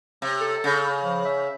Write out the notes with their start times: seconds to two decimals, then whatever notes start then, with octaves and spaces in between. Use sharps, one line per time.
0.22 C3
0.41 A4
0.64 C#3
1.03 F3
1.25 E5